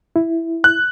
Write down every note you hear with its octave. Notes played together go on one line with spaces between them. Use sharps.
E4
F#6